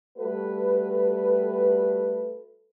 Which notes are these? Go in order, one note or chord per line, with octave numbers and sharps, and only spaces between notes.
G3 A3 F#4 A4 B4